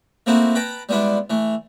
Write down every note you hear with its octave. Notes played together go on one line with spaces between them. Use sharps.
A3 A#3 C4 D#4 E4 F#4
B4 G5 A5 A#5
G3 G#3 B3 D4 E4
E3 A3